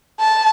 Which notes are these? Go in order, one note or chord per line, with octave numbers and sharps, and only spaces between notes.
A5